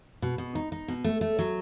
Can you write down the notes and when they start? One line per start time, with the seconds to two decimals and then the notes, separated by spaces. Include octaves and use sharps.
0.22 B2
0.38 B2
0.55 D#4
0.72 D#4
0.88 B2
1.04 A3
1.21 A3
1.39 F#3